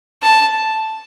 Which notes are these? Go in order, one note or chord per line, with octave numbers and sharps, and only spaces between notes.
A5